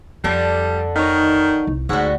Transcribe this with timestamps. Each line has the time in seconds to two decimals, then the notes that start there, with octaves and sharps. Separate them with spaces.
0.24 F2 D3 G3 D4 A4
0.96 D#3 D#4 C#5
1.67 C2
1.89 D2 G#2 G3 F#4